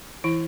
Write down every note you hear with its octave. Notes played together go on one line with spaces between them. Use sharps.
E3 E4